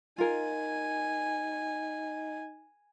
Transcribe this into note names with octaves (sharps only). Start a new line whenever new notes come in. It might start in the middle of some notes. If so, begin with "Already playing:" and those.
D#4 F4 A#4 G#5